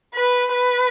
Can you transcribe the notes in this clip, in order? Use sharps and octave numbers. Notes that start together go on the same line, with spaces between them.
B4
B4